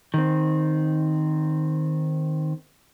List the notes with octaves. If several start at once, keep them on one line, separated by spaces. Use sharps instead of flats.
D#3 C4